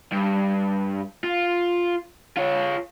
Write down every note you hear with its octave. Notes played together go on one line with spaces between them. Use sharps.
G2
F4
F4 C#5